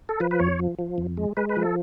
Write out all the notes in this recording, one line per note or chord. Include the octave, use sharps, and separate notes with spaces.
A4
F3 B4
B4
F2 C#5
F3
F3
F2
G#3
G#3 B4
B4
F3
A4